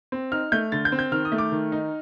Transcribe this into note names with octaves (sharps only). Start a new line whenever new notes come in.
C4
D#4 F6
A3 G6
D3 A6
G6
C4
G6
D#3 F6
D#6
A3
D6
D#3
D#4